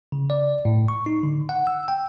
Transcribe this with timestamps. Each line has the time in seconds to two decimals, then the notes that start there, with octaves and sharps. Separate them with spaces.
0.12 C#3
0.30 D5
0.65 A2
0.88 C#6
1.06 D#4
1.23 D3
1.49 F#5
1.67 E6
1.88 G5